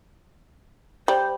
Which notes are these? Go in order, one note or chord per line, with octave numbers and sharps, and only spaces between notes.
G3 C5